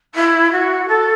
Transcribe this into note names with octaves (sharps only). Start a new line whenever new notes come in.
E4
F#4
A4